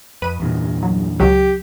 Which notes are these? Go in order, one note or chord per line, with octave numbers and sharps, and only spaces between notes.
F2 B4 D#7
E2 G2 A#2
F#3
C#2 F#3 G4